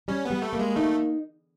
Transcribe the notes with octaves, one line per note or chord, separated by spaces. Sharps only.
G3 C#4
G3 B3
A3
A#3
G#3
A3 D#4